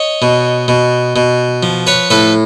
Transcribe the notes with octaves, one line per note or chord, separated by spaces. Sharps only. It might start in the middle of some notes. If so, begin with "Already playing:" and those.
Already playing: C#5 D#5
B2
B2
B2
F3
B4 C#5
A2 A4 B4